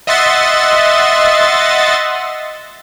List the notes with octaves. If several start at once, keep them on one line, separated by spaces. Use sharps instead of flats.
D#5 E5 F#5 C6 A6